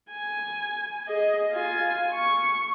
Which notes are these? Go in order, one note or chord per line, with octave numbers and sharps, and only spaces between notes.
G#5
G#4 D#5
F4 G#5
C#6